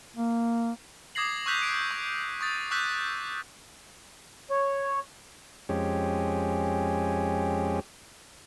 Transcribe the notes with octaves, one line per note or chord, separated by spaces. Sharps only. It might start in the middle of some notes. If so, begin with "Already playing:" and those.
A#3
D6 D#6 G#6 A#6 C7 F#7
C#6 E6 F#6 G6 B6 F7
C7 D7
C#6
C#6 D#6 A6
C#6 D6 E6 F#6 G6 B6
C#5
F2 G#3 C#4 G4